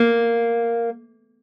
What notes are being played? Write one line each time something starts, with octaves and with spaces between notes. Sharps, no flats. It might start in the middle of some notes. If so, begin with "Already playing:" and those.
Already playing: A#3